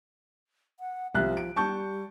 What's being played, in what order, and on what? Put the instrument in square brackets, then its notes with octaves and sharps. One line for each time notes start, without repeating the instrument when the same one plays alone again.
[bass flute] F#5
[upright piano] C2 F#6 [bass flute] F3
[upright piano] D7
[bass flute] G3 [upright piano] A5 C#6 G6